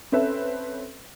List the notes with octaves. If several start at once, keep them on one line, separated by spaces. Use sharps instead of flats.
C4 C#4 A4 B4 E5